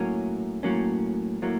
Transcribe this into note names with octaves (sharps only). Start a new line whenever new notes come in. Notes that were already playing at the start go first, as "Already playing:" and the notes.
Already playing: A2 F#3 A#3 C#4
A2 F#3 A#3 C#4
A2 F#3 A#3